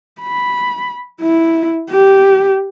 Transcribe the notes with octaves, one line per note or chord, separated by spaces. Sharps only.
B5
E4
G4